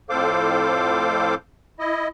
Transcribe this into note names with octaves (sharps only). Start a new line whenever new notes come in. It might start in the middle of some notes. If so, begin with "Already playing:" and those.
F2 A2 A4 C5 F5 D6
E4 D#5